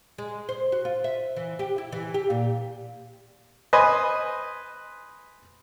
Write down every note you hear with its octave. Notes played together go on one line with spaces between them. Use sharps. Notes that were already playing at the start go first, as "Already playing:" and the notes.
G#3
C5
F#4
F4
E5
E3
G4
E4
E3
G4
A#2
B4 C5 D#5 G#5